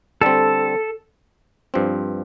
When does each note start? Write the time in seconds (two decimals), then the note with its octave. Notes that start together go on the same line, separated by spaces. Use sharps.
0.21 D3 G3 C4 A4
1.74 G2 F3 C4